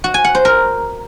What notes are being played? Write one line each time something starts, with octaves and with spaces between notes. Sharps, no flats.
F#4
G#5
F#5
C5
A#4